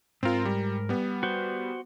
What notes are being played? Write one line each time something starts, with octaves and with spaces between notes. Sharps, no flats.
G#2 C4 F4 A#4
G3
G3 B3
F#4 C5